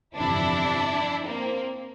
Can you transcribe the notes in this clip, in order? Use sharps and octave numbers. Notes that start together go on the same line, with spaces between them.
G1 F2 C3 E3 D4 E4
A#3 C4